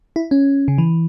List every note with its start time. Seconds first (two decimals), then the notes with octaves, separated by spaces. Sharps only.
0.16 E4
0.31 C#4
0.68 C#3
0.78 E3